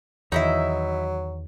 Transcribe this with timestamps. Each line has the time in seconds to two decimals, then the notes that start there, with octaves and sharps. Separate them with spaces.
0.32 E2 D#3 F#3 D#4 E4 E5